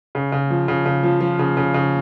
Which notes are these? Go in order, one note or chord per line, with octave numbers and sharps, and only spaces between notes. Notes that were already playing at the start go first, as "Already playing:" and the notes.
C#3
C#3
F3
C#3
C#3
F3
F3
C#3
C#3
C#3